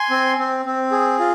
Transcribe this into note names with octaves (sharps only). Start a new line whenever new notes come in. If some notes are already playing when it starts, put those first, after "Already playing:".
Already playing: G#5 C6
C4
C4
C4
G#4
F4